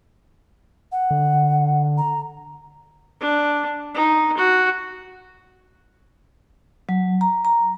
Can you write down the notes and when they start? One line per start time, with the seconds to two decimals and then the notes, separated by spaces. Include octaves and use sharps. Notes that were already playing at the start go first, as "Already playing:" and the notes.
0.92 F#5
1.11 D3
1.98 A#5
3.21 D4
3.94 D#4
4.37 F#4
6.89 F#3
7.21 A#5
7.45 A#5